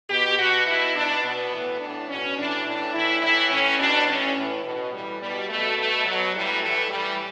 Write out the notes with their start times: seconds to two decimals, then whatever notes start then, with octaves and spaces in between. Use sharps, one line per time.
0.10 B2 G4
0.39 B2 F#4
0.67 B2 E4
0.96 B2 D4
1.23 B2 B3
1.52 A2 E3
1.80 A2 E3 D4
2.09 B2 C#4
2.37 A2 E3 D4
2.65 A2 E3 D4
2.94 A2 E3 E4
3.22 A2 E3 E4
3.51 A2 E3 C#4
3.79 B2 D4
4.07 A2 E3 C#4
4.36 A2 E3
4.64 B2
4.92 A2 G3
4.97 E3
5.21 B2 G3
5.49 B2 A3
5.77 B2 A3
6.05 B2 F#3
6.34 A2 E3 G3
6.63 A2 E3 A3
6.90 A2 E3 G3